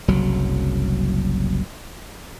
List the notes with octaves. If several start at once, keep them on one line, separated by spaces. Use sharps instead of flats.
F#1 C2 F#3